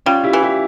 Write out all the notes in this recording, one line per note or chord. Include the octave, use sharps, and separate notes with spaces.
G3 C#4 F4
E4 G4
E3
E4 G4